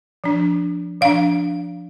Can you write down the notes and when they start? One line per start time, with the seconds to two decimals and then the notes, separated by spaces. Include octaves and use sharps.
0.24 F3 D4
1.01 F3 D4 F5